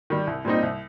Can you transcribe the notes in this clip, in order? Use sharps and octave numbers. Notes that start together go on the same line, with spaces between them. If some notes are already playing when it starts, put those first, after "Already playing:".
D#3 G3
C2
A#2 G3 C4 D#4
C2